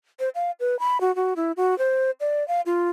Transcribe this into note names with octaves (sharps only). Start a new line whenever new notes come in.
C5
F5
B4
B5
F#4
F#4
E4
F#4
C5
D5
F5
F4